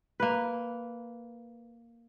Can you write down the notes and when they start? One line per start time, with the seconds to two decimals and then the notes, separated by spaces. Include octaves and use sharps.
0.20 A#3 B4